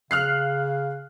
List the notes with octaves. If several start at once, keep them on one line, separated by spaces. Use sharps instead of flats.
C#3 F5 F6 F#6 C7